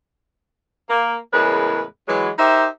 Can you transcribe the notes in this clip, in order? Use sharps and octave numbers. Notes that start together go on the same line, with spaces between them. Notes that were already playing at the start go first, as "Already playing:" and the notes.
A#3
E2 A2 C#3 G#3 A#4 B4
E3 F#3 G#3
D#4 G4 A#4 C5 E5